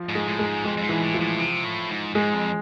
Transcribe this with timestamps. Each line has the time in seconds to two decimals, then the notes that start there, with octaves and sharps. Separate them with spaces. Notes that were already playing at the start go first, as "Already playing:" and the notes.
Already playing: F3
0.09 G#2
0.15 G#3
0.27 A2
0.39 G#3
0.46 G#2
0.64 F2 G#3
0.77 F2
0.83 G#2
0.89 B2 E3
1.02 A2
1.14 F3
1.21 A2
1.40 C3
1.64 A2
1.90 G#2
2.15 G#2 G#3
2.34 F2